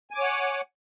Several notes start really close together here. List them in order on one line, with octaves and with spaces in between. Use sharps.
G#5 D6 C#5 F#5